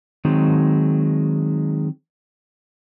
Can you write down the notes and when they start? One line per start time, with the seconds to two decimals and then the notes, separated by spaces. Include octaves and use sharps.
0.25 D#3 F#3 G#3 C4 D#4